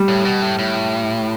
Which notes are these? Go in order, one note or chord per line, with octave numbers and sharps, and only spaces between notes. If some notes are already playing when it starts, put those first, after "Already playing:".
Already playing: G3
A2
B2
A2
A2